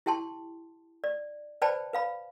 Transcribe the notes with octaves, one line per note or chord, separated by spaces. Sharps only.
E4 G4 G5 A5 C6
D5
B4 C5 D5 G5 A5 B5
B4 F5 B5